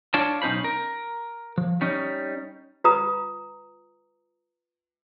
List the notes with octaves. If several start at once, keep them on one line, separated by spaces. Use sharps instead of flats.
D4 F4 C#5 D5 A5
B1 C#4 D#4 C5 B5
A#4
F3
G3 C#4 D#4
F4 B4 A#5 D#6